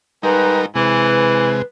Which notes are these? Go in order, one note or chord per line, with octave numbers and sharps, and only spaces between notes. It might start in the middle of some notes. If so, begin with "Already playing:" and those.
G#2 G3 D#4 A#4 B4
C3 E3 G#3 B4